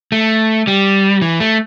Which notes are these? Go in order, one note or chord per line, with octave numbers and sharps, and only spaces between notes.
A3
G3
E3
A3